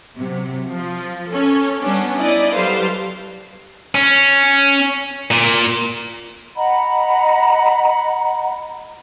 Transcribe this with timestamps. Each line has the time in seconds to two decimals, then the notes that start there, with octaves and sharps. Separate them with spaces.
0.16 C3 F#3
0.69 F3
1.32 C#4 A4
1.82 G3 B3 C#4 D4
2.19 D#4 E4 D5 D#5
2.54 F#3 G3 A4 B4 C5 F5
3.95 C#4
5.31 A#2
6.56 D#5 F#5 A#5 B5